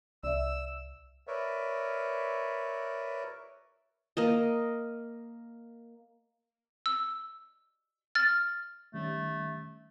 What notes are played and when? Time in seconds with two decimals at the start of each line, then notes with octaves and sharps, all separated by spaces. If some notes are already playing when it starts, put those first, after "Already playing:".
0.23 C2 D5 E5 E6
1.27 A#4 B4 C#5 D5 E5
4.17 A#3 A#4 D#5
6.86 E6
8.15 F6 A6
8.94 D#3 G3 A3 C#4